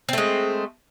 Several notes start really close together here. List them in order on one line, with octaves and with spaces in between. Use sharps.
C4 A3 G#3